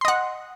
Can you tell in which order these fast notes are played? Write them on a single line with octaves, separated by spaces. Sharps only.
C6 D#5 F#5